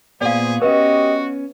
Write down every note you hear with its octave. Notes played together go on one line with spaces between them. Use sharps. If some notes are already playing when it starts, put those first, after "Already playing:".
A#2 B3 G#4 C5 D5 F5
B3 C#4 F#4 G4 B4 D#5